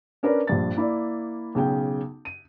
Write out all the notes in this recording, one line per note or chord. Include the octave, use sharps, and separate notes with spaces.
C#4 D4 A#4 B4 D5
A#1 G2 A6
A#3 E4 D5
B1 C#3 G5
D#7